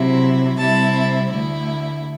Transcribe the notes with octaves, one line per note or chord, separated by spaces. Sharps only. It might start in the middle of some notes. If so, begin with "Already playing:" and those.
Already playing: C3 F#3 C4 E4
C3 G3 C4 E4 A5
D2 D3 A3 E4